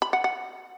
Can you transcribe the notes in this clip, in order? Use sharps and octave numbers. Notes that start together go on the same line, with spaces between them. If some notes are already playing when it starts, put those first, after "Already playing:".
B5
F#5
F#5